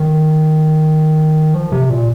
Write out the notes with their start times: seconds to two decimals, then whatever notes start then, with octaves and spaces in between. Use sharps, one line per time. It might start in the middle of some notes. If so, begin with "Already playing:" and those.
Already playing: D#3
1.54 F3
1.72 C3
1.90 A#2